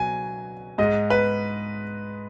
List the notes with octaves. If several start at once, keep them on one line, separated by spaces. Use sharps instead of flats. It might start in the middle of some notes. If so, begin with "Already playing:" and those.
Already playing: B2 F#3 G#5
G#2 G#3 D#5
B4